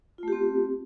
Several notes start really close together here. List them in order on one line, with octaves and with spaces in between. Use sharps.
F4 A3 G4 C4